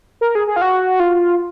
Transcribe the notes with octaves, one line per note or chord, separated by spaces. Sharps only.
A#4
G#4
G#4
F4
F#4
F4